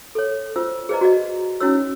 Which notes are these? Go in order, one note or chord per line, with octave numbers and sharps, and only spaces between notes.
A4 C#5
F4 C5 E6
G#4 B4 C5 D5 D#5 A#5
F#4 D5 D#5
C#4 D#4 E4 F#4 C#5 E6